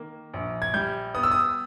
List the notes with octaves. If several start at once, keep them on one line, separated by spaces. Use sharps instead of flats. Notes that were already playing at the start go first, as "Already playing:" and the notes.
Already playing: D#3 A#3
A#1
G#6
G3 G6
B3 D#6
E6
D#6